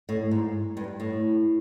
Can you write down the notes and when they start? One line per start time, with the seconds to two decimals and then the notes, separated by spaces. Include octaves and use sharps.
0.09 A2
0.31 G#2
0.77 G2
1.00 A2